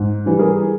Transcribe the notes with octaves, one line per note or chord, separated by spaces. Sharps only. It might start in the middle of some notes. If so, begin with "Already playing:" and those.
Already playing: G#2
E3 G3
G#4 A#4